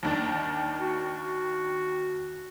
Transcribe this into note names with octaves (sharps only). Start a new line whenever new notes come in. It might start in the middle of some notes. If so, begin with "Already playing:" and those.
D#2 D#3 D4
F#4